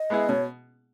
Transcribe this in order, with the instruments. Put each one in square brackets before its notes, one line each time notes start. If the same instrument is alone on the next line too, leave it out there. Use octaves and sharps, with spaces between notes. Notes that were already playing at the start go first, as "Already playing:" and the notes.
Already playing: [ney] D#5
[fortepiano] G#3 B3 E4 G#4
[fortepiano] B2 [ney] C#5